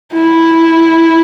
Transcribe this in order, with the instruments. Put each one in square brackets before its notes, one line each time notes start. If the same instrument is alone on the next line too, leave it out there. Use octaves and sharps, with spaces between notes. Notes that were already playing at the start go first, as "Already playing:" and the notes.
[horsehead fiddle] E4